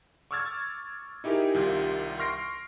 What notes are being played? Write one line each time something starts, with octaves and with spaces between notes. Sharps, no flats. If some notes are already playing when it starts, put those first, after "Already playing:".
C#6 D6 E6 F6 G#6 A6
D#4 E4 G4 G#4 A#4
C2 C3 D#3 F4
C6 C#6 F6 A#6 C7 D7